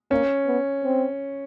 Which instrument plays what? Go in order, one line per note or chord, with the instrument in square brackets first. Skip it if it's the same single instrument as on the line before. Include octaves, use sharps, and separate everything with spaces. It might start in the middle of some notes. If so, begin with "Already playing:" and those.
[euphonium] A#3 [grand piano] C#4
[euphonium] B3
C4